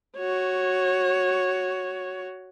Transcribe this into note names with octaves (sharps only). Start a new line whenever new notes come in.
F#4 C#5